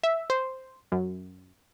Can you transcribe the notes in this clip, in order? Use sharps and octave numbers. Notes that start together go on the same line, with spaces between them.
E5
C5
F#2